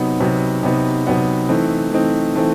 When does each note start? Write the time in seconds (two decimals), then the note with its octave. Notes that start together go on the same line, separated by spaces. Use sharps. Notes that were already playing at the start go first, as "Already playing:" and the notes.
Already playing: C3 F#3 B3 D#4
0.20 C3 F#3 B3 D#4
0.63 C3 F#3 B3 D#4
1.06 C3 F#3 B3 D#4
1.49 E3 A3 C4 D#4
1.92 E3 A3 C4 D#4
2.35 E3 A3 C4 D#4